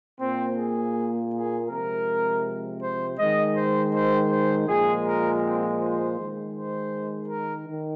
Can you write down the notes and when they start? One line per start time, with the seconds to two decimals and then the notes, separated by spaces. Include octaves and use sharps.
0.20 A#2 A#3 C4
0.58 G#4
1.33 G#4
1.69 C3 F3 G#3 A#4
2.82 C5
3.18 D#3 G#3 D#5
3.56 C5
3.94 C5
4.30 C5
4.68 A#2 F3 G#3 G#4
5.05 A#4
5.42 C4
5.79 C5
6.17 D#3 G#3
6.54 C5
7.28 A#4
7.66 D#3